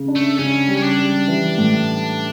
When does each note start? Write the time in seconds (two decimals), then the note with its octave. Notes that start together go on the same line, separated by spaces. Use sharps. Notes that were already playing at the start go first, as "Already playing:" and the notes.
Already playing: C#3
0.08 D4
0.16 A3
0.38 C#3 C#4
0.68 G3
0.77 C#4
0.83 D4
0.99 G3
1.28 E3
1.58 A2